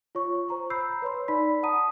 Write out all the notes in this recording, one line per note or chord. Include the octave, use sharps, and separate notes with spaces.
F4 C#5 C#6
C5 A#5 C#6
B5 E6 G6 C7
B4 C#5 C6
D#4 D5 B5 B6
F#5 A5 A#5 D#6 D#7